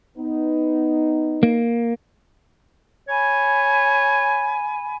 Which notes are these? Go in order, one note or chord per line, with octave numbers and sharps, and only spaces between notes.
B3 D#4
A#3
C#5 G#5 B5